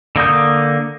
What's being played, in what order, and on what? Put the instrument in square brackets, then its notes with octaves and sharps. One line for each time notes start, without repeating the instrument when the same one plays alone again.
[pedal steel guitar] D3 A#3 D#6 G6